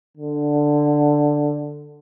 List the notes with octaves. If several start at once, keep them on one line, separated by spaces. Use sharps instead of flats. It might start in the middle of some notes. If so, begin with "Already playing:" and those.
D3